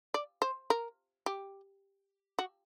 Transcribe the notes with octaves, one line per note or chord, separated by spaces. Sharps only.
D5
C5
A#4
G4
F#4